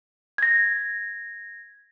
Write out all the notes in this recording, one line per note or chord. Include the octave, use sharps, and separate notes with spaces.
G#6 A#6